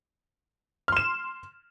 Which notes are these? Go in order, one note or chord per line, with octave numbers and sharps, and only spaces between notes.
C6 F6 E7